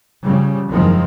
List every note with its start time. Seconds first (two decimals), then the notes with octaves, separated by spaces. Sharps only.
0.24 C#3 F3 G3
0.70 F#1 E2 D#3 F3 G#3 C4